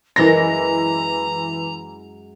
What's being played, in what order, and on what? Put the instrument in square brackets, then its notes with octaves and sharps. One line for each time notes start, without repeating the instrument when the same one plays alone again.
[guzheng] F#2 G#3 C6 [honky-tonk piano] E3 A#6 [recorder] A#5